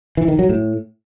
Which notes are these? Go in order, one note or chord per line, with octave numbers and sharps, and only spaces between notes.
E3
D#3
F#3
A2